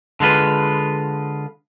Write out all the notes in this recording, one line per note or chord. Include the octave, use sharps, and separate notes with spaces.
D3 G#3 F4 B4